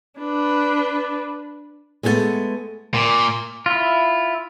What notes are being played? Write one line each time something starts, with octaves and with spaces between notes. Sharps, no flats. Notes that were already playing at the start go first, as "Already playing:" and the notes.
D4 B4
G#3 A3 B3 E4 A4
A#2
E4 F4